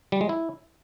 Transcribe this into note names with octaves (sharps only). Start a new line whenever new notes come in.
G3
G#3
E4